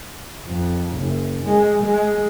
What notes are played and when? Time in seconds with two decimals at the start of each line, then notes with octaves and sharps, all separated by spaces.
0.47 F2
0.97 F#1
1.44 G#3
1.83 G#3